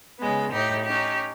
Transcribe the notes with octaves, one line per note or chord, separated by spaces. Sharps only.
C#3 G#3 B3
A2 D#4 G4
C#4 D#4 G4